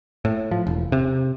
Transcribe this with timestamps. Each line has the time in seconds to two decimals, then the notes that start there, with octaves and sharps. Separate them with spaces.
0.25 A2
0.51 F3
0.67 E1
0.92 C3